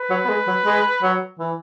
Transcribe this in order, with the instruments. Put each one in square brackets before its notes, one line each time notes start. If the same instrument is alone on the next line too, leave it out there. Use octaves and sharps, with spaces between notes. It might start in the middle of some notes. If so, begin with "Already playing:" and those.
Already playing: [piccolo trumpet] B4
[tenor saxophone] F#3
B3
G#3
F#3
G#3
F#3
E3